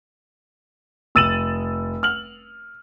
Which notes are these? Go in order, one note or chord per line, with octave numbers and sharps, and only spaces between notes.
F1 E6 A6 D#7 E7 F#7
F6 F#7